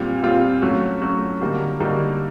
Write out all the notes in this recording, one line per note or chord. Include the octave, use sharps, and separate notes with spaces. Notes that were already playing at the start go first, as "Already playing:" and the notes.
Already playing: A#2 G3 C4 F4
A#2 G3 C4 F4
F#3 A3 C#4 F#4
F#3 A3 C#4 F#4
D3 G3 A#3 D#4 F#4
D3 G3 A#3 D#4 F#4